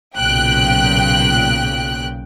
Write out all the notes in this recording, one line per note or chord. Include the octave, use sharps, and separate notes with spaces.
B1 A#2 C#3 G5 F#6